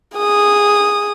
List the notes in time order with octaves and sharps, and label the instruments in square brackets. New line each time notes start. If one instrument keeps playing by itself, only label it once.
[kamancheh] G#4 D#6